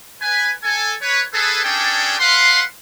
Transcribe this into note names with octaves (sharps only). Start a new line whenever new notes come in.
B4 G#5
A4 G#5
B4 C#5
G#4 A4 B4
C#4 D4 G#4 A4 D5 G5
B4 F5 F#5 C6